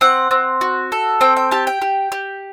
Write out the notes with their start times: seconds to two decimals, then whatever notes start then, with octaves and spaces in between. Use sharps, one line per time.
0.01 C4 F#5
0.31 C4
0.61 F#4
0.92 A4
1.21 C4 G5
1.37 G5
1.51 G4 A5
1.67 G5
1.82 G4
2.12 G4